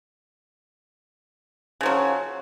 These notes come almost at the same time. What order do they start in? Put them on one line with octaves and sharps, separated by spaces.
C#3 F3 F#3